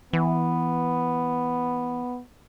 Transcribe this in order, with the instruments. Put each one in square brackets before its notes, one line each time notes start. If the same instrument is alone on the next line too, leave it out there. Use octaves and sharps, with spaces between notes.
[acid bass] E3 [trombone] B3